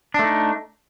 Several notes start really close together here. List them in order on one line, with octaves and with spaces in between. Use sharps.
D4 A3 D#4